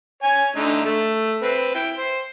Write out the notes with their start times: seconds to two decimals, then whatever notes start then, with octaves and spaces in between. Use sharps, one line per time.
0.23 C#5 G#5
0.56 D3 A3 D#4
0.86 A3 A4
1.42 C4 B4
1.75 E4 G5
1.98 C5